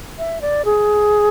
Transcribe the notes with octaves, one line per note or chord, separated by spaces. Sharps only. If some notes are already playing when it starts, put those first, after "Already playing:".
E5
D5
G#4